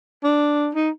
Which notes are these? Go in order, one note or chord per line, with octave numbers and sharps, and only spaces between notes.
D4
D#4